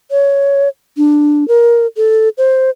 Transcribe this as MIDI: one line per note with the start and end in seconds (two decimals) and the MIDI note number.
0.11 0.68 73
0.97 1.47 62
1.48 1.86 70
1.97 2.29 69
2.38 2.70 72